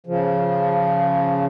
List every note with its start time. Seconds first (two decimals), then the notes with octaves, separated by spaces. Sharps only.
0.06 C#3 F3